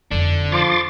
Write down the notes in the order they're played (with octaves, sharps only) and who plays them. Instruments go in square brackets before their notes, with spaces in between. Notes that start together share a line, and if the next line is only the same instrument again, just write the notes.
[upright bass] F2 D#4 [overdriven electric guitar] D3 D4
[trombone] F3 [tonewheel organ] C6 D6 A6